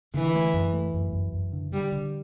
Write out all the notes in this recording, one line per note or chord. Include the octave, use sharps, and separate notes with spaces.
D3 E3
A3
F#2
A3
F#2
F#2
F#2
D3
D3 G3
D3